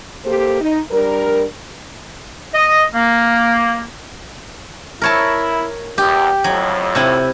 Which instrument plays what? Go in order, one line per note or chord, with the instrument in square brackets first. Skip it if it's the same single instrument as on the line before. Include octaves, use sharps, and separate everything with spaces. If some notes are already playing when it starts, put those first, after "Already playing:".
[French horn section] A#3 G4 A4 C5
D#4
G3 D4 A#4
[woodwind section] D#5
A#3
[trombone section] E4 [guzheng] A#4 C#5 A5
[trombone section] E2 [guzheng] G4
[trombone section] F2 A2 [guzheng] F#3
[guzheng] C3 E4